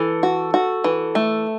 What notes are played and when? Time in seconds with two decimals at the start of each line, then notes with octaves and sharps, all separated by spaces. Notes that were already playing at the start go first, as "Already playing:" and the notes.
Already playing: E3 A4
0.23 F#4
0.54 F#4
0.84 E3
1.15 A3